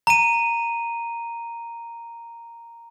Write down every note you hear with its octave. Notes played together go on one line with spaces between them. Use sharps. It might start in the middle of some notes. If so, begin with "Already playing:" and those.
A#5 D#7